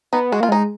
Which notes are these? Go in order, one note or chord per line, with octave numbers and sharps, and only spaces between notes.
B3 D#4
G#3 F#4
A#3 F4
G#3 D#4